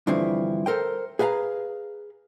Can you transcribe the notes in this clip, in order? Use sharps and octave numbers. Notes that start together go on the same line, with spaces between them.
G2 D3 E3 F3 C4 E4
A4 A#4 C5 G5
G#4 B4 F5 G#5 A#5